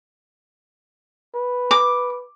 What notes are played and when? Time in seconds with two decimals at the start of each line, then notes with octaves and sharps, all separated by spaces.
1.35 B4
1.71 D6